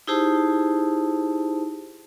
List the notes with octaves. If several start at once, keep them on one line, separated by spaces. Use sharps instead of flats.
D#4 E4 G4 G#4 C5 A5